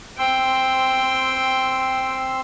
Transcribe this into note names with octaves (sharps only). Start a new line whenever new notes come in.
C4 G5 C6 E6